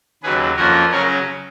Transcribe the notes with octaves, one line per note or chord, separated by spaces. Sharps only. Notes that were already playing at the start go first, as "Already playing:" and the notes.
D#2 C#3 F#3 G#4 B4
F2 F3 A#3 C#4 F#4 A#4
C#3 F#3 C#4 A#4 C#5